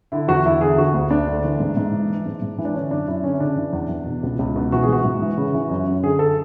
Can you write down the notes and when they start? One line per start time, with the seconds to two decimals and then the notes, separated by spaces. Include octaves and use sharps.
0.12 D3 E4
0.28 E2 F#4
0.45 E2 E4
0.61 D3 G#4
0.77 D3 F#4
0.94 D2
1.10 D2 D4
1.27 D3
1.44 E3
1.60 G#2
1.77 G#2
1.92 E3
2.10 E3
2.26 G#2
2.42 G#2
2.58 E3
2.65 D4
2.74 D3 C#4
2.91 F#2 D4
3.08 F#2 E4
3.24 D3 C#4
3.34 C#4
3.40 C#3 D4
3.58 E3
3.73 E2
3.89 E2
4.06 B2
4.23 C#2
4.39 C#2
4.56 B2
4.72 E3 F#4
4.83 G#4
4.89 G#2 F#4
5.05 G#2
5.22 E3
5.38 C#3
5.54 E3
5.70 F#2
5.87 F#2
6.03 D3 G#4
6.19 A4